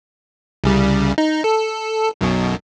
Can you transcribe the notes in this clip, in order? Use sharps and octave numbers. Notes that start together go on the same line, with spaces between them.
C2 C#3 G3
D#4
A4
B1 F#2 B2